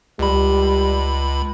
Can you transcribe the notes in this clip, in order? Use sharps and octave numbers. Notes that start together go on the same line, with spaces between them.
C#2 G3 B5